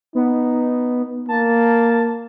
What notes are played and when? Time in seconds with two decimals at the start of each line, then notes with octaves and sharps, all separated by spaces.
0.15 B3 D#4
1.29 A#3 A5